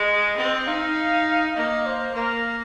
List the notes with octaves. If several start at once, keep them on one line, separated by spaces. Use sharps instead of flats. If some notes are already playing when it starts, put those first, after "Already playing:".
Already playing: G#3 D#5
C4
D#4 F5
A#3 D#5
C5
A#3 A#4